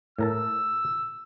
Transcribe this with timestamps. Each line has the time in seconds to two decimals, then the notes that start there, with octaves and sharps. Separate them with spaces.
0.19 A2 A#4 A5 E6